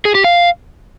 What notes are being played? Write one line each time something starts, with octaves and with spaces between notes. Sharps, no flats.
G#4
G4
F5